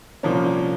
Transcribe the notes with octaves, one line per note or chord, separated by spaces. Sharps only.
C2 A#2 F3 A#3 C#4